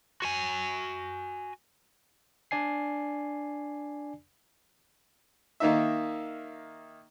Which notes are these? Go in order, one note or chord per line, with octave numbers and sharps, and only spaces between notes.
F#4 G#5
D4 D5 G#5 C7
D#3 A#3 D#4 E5